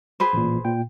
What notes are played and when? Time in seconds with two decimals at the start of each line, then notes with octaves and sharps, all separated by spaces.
0.20 G#4 B4 C5
0.33 A1 A#2
0.64 A#2 G5